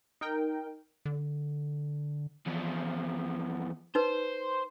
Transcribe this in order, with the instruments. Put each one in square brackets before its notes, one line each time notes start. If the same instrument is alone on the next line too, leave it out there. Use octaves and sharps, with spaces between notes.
[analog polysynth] D#4 A#4 G5
[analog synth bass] D3
[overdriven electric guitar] E2 F3
[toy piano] D#4 B4 [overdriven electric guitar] C5